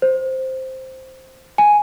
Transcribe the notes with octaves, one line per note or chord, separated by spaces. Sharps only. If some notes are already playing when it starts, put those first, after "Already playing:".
C5
G#5